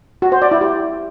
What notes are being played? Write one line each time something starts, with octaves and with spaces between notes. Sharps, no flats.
F#4
C5
D5
E4
G4